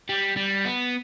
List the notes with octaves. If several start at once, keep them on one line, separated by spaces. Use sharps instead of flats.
G3
G3
B3